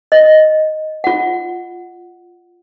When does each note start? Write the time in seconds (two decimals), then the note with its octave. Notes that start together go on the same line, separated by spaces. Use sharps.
0.12 D#5
1.04 F4 F#5